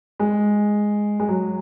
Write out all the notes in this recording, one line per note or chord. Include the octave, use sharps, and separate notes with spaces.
G#3
G#3
F#3